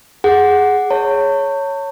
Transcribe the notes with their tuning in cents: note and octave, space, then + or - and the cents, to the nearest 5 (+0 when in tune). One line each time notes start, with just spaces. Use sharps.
G#4 +0 F#5 +0
C#5 +0 A5 +45